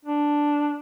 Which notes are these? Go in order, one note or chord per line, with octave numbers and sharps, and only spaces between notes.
D4